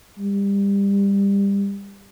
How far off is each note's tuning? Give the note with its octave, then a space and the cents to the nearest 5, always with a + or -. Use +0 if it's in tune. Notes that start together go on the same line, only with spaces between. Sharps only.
G3 +25